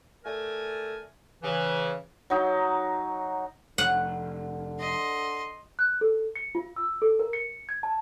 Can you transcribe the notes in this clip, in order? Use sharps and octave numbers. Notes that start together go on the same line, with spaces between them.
A3 A#4 D5 G#5
C#3 E3
F#3 D#4
F1 D3 F#5
D#5 C6
F#6
A4
C#7
F4
E6
A4
A#4
C#7
G#6
A5